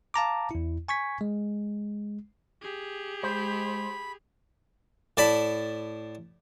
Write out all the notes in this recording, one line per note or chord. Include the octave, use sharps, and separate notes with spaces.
F5 A5 A#5 D6
E2 E4
G#5 C#6 G#6 B6
G#3
G4 G#4
G#3 C5 B5
A2 D5 A5 B5